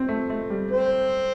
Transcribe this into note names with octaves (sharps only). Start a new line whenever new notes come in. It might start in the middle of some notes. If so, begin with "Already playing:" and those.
Already playing: C4
A3
A3
G3
C4 C5